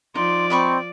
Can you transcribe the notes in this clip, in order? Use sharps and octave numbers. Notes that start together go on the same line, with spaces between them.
F3 D#4 D5 C6
C4 D#5 B5 C#6